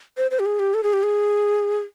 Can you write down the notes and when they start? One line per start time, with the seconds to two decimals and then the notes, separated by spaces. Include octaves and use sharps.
0.17 C5
0.31 C5
0.39 G4
0.46 G#4
0.59 G4
0.74 A4
0.83 G#4
0.93 G4
1.03 G#4